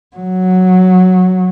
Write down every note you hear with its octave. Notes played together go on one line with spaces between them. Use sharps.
F#3